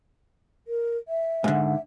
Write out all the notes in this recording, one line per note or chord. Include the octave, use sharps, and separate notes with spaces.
A#4
E5
G#2 D3